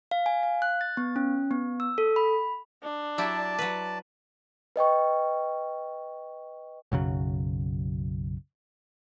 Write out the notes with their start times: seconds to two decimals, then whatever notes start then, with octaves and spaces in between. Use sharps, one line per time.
0.11 F5
0.26 G#5
0.43 F5
0.62 F#6
0.81 A6
0.97 B3
1.16 C#4
1.51 B3
1.80 E6
1.98 A4
2.16 B5
2.83 D4
3.18 F#3 E4 G4 D5 A5
3.59 F#3 B4
4.76 B4 D#5 G5 C#6
6.92 B1 F#2 C#3 F#3